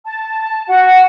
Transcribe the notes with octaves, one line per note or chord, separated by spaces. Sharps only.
A5
F#4 F#5